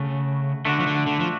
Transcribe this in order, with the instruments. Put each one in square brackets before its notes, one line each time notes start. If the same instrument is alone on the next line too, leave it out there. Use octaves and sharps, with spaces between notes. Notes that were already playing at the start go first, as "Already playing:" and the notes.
Already playing: [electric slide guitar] C#3 [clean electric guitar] A3 F#4
[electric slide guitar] D3 [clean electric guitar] A3 D4 F#4
[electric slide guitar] F3
D3
D3
F3